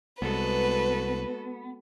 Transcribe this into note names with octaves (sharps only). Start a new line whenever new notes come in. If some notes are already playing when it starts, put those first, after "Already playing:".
C2 G#3 B3 F#4 A4 B4